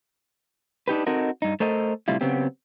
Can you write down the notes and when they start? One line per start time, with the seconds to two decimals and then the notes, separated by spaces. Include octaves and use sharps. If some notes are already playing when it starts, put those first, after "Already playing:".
0.88 D4 D#4 G4 B4
1.06 C4 D#4 F#4 A4 A#4 D#5
1.42 G2 D#4
1.60 A3 A4 A#4 C5 D#5
2.08 A2 C3 G3 E4 F4
2.21 C#3 F#3 B3 C4 G4